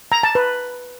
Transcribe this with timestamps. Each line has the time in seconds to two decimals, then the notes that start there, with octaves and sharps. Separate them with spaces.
0.12 A#5
0.23 A5
0.35 B4